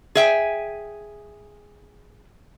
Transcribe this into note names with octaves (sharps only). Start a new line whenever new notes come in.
G#4 E5 G5 G#5